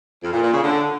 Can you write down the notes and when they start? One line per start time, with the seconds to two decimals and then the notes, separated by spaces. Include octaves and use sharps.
0.23 F2
0.33 A#2
0.43 A#2
0.53 C#3
0.63 D3